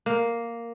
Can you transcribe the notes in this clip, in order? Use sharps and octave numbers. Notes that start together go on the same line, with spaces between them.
A#3